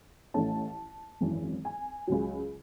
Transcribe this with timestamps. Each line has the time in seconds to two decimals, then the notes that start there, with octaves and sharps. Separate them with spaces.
0.34 A1 A2 E3 A3 C#4 A5
1.21 G#1 F#2 E3
1.65 G#5
2.07 C#2 C#3 F#3